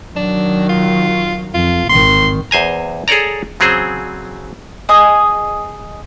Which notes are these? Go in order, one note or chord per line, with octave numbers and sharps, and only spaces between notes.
D#3 F#3 D4
F4
F2 F4
G#1 D#3 C6
E2 C5 G#5 A#5
G#4 A4 C#5 D5 A#5
C#3 F#3 C4 G#4 C5
G#4 D#5 D#6